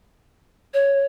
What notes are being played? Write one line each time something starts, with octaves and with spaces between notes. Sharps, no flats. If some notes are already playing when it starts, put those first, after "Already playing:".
C#5